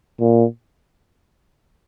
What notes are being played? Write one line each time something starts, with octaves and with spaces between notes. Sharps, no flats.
A#2